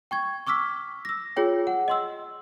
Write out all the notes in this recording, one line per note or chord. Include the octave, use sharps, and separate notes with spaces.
G5 C#6 G#6
C#6 D6 E6 F6 B6
E6 A#6
F4 G#4 C#5 G5
F#5
D#5 C6 E6